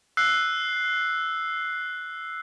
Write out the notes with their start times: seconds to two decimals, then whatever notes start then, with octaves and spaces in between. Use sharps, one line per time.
0.17 E6 F#6 C7